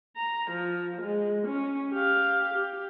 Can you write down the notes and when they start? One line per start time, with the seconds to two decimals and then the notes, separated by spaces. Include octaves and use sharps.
0.17 A#5
0.50 F3
1.01 G#3
1.47 C#4
1.92 G4 F5
2.53 G4